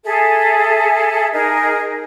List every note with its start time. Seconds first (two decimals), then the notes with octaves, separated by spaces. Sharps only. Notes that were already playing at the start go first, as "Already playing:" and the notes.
0.05 G#4 A4 E5
1.32 D#4 G#4 A#4